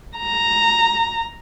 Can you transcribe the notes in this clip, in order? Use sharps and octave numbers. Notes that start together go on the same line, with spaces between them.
A#5